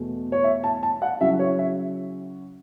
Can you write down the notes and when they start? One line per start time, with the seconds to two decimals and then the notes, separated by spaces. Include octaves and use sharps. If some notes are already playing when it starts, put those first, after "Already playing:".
Already playing: E2 B2 A3
0.32 C#5
0.44 E5
0.64 A5
0.83 A5
1.02 F#5
1.20 C#3 F#3 C#4 E4 E5
1.39 C#5
1.59 E5